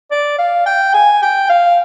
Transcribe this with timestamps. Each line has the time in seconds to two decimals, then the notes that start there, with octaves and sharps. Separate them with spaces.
0.11 D5
0.39 F5
0.66 G5
0.94 G#5
1.22 G5
1.50 F5